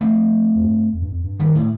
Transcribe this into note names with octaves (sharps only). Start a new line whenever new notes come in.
F3 A3 C4
F2
G2
F2
G2
F2
G2
D#3 G3
A2